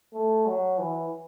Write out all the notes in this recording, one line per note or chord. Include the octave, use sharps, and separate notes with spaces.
A3
F#3
E3